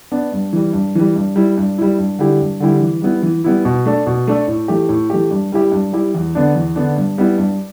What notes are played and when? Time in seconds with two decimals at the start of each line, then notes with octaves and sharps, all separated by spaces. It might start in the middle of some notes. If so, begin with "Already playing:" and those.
0.12 B3 D4
0.32 G2
0.53 E3 G3
0.73 G2
0.95 E3 G3
1.16 G2
1.36 G3 E4
1.58 G2
1.78 G3 E4
1.99 G2
2.19 D3 G3 E4 G4
2.41 G2
2.60 D3 G3 E4 G4
2.81 E3
3.02 G3 B3 E4
3.23 E3
3.44 G3 B3 E4
3.65 B2
3.86 A3 D4 A4
4.06 B2
4.27 A3 D4 A4
4.47 A2
4.68 E3 A3 G4
4.89 A2
5.10 E3 A3 G4
5.31 G2
5.52 G3 E4 G4
5.72 G2
5.93 G3 E4 G4
6.15 E2
6.35 D3 B3 D4
6.55 E2
6.76 D3 B3 D4
6.96 G2
7.18 G3 B3 E4
7.38 G2